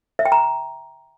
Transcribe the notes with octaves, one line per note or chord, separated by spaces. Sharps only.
E5
G5
A#5